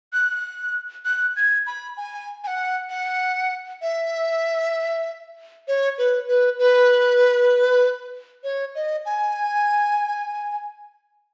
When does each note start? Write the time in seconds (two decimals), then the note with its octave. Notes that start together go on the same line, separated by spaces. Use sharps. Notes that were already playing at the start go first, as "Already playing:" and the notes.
0.13 F#6
1.05 F#6
1.36 G#6
1.67 B5
1.97 G#5
2.44 G#5
2.47 F#5
2.89 F#5
3.82 E5
5.68 C#5
5.98 B4
6.28 B4
6.59 B4
8.44 C#5
8.75 D#5
9.06 G#5